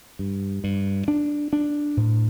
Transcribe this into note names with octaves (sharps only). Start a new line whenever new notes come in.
G2
G2
D4
D4
A2